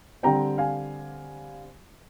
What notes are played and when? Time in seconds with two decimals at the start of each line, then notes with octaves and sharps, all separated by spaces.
0.23 D3 G3 C4 G5 A#5
0.58 F5 G#5